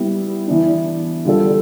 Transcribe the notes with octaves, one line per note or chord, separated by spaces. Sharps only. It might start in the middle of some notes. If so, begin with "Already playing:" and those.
Already playing: G3 B3 E4
E3 B3 D4
D3 G3 D4 F4 A4